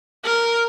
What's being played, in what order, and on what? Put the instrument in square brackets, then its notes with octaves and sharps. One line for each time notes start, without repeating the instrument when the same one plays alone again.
[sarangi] A#4